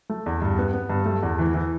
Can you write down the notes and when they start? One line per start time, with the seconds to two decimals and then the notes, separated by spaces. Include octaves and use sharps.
0.10 A3
0.26 E2
0.41 G2
0.58 B3
0.74 B3
0.90 G2
1.06 A3
1.23 E2
1.39 E3
1.54 E3